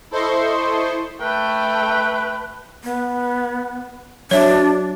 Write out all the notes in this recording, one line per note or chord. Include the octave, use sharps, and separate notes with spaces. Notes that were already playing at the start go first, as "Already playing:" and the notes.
E4 A4 C5 D#5 C6 C#6
A3 B4 G5
B3
F#3 D4 C#5 E5